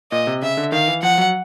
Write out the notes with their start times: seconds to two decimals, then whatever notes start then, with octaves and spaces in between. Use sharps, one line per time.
0.12 A#2 D#5
0.27 C3
0.42 C#3 E5
0.57 D3
0.72 D#3 F5
0.88 E3
1.03 F3 F#5
1.18 F#3